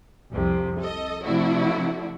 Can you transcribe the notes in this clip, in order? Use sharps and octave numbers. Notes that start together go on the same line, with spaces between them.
C2 F2 C3
A4 D#5
C3 F3 A3 D4 E4 F#4